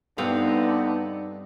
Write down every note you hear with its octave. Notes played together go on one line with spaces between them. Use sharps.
G2 D3 B3 C4 D#4 F5